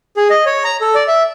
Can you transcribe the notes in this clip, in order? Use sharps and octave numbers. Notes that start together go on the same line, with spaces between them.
G#4
D#5
C#5
A#5
A4
D5
E5